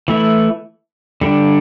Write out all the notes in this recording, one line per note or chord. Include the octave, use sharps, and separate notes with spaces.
E3 A3 E4
D3 G3 D4